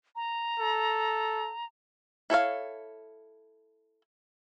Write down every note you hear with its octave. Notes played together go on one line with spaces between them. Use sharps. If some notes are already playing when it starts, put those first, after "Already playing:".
A#5
A4
E4 A4 C#5 F5